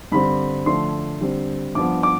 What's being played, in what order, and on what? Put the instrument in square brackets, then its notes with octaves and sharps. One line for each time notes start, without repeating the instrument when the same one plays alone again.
[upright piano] G2 D3 G3 C4 B5
D3 F3 A3 C6
D3 G3 C4
G2 F3 B3 D6
D6